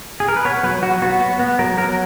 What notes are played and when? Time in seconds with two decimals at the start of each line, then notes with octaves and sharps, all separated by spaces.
0.20 G#4
0.28 A#4
0.36 B4
0.45 B3 C#5
0.63 F#3 B4
0.82 F#3 F#4
1.02 B3 F#4
1.21 B3
1.39 B3
1.59 F#3 A#4
1.78 F#3 A#4